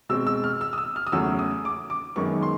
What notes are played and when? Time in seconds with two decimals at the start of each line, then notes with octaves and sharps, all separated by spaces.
0.09 B2 G#3 C4 E6
0.27 E6
0.44 F6
0.61 E6
0.73 D#6
0.78 E6
0.96 F6
1.07 D#6
1.12 E2 C#3 F#3 A3 E6
1.39 D#6
1.65 D6
1.90 D6
2.16 F#2 D#3 G#3 B3 C#6
2.43 C6